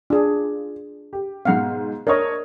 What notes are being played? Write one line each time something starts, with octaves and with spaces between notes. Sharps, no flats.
D4 F4 G#4
G4
G#2 B2 F5 F#5
D4 A#4 C#5 D#5